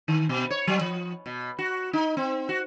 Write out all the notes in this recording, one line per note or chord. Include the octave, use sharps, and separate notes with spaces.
D#3
B2
C#5
F#3
F3
B2
F#4
D#4
C4
F#4